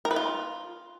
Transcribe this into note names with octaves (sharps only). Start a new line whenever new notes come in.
A#4
B4
F4